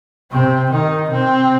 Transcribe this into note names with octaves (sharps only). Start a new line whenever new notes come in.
C3 C4
D#3 D#4
C3 C4